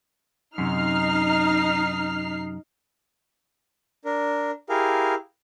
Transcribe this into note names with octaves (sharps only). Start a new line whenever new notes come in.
F#2 C3 D#4 F6 C7
D4 A#4
E4 G4 G#4 A#4 F5